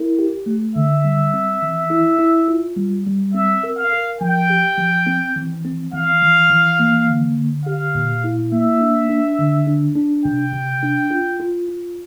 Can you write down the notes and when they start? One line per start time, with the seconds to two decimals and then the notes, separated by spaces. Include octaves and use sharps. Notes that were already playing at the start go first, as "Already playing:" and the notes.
Already playing: E4 A#4
0.19 G4
0.46 A3
0.76 D3 E5
1.05 G3
1.34 C4
1.62 E3
1.90 E4
2.19 E4
2.48 F4
2.77 G3
3.06 G3
3.34 C4 E5
3.63 A#4
3.78 F5
3.93 A#4
4.21 F3 G5
4.50 G4
4.78 F3
5.07 C4
5.36 E3
5.65 C4
5.93 E3 F5
6.22 E3
6.50 E3
6.79 A#3
7.08 D3
7.36 D3
7.66 G4 F5
7.95 A#2
8.24 E4
8.52 A#3 E5
8.81 D4
9.09 D4
9.38 D3
9.67 D4
9.96 D4
10.25 C3 G5
10.53 C3
10.83 D4
11.11 F4
11.40 F4
11.69 F4